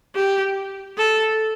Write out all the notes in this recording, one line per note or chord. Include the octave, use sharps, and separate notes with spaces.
G4
A4